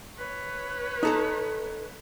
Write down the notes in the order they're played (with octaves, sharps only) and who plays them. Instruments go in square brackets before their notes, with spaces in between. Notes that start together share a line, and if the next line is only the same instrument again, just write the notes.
[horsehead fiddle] B4 C#5
[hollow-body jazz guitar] D#4 A4 A#5